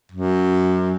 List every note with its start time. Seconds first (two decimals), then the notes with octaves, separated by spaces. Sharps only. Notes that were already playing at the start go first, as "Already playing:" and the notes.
0.12 F#2